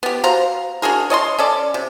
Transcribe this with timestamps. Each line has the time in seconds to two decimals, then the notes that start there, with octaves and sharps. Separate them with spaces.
0.03 B3 G4
0.24 F#4 C5 F5 A#5
0.82 D4 F#4 G#4 A#4
1.10 C#5 D#5 A5 C6
1.38 C#4 A4 D5
1.74 C3